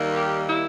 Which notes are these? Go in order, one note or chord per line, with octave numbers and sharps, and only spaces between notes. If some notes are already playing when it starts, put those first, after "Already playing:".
Already playing: D#2 D#3 G3 A#3
G4
E4